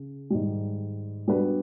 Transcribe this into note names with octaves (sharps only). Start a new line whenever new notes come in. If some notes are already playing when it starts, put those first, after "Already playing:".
Already playing: C#3
G#2 D#3 G3
G3 B3 D4 F#4 B4